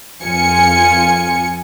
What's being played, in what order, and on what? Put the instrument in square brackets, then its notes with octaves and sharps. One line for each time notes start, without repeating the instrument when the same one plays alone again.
[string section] F2 F4 G#5 C#7